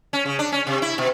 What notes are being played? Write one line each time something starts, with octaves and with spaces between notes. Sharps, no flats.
C#4
C#3
D4
C#4
C3
E4
B2